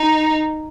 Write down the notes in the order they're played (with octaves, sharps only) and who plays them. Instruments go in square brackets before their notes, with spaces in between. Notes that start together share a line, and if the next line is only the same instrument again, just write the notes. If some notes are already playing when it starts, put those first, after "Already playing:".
Already playing: [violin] D#4